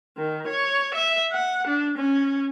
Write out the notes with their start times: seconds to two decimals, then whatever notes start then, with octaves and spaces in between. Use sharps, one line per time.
0.18 D#3
0.47 C#5
0.95 E5
1.32 F#5
1.67 D4
1.98 C#4